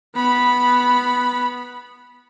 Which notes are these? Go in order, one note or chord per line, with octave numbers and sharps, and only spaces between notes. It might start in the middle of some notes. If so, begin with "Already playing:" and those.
B3 B5